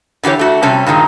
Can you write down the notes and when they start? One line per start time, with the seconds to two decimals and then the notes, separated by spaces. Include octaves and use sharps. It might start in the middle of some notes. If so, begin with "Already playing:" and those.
0.23 D3 E3 F#4 G4 C#5
0.39 A3 F#4
0.62 C3 G3 C#4 A5
0.86 G2 A#2 D#3 G#3